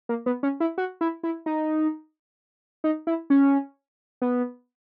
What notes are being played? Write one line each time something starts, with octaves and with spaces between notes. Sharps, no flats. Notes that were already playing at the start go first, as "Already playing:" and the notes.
A#3
B3
C#4
E4
F#4
E4
E4
D#4
D#4
E4
C#4
B3